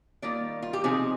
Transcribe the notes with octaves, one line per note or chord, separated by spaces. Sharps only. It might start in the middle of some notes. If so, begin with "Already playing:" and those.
D#3 G3 A#3 F4 D5
F4
G4
C3 F3 C4 D#4 G#4